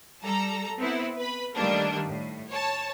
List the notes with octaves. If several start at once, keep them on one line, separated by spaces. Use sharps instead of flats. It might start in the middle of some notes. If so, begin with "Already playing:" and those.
G3 A4 A#5
B3 C4 E4
B4 B5
D#3 G3 A3 A#3 D4
A2
C#5 A5